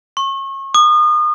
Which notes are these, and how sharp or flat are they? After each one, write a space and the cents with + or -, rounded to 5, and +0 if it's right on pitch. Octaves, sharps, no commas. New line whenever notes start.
C#6 -35
D#6 -35